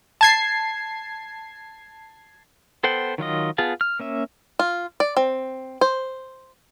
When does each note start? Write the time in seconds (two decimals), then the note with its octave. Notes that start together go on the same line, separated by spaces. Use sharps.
0.21 A5 G#6 C7
2.83 B3 A4 C5 F#5 G5
3.18 D#3 F#3 F4 D#5
3.58 B3 F4 G#4 A5
3.81 F6
4.00 A#3 C#4 E5
4.59 F4
5.00 D5
5.17 C4
5.81 C5